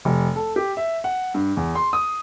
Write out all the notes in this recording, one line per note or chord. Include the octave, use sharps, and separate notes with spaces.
F1
A4
G4
E5
F#5
G2
E2
C6
D#6